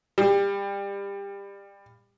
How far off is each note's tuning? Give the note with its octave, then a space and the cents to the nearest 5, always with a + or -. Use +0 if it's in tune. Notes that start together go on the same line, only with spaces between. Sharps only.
G3 +25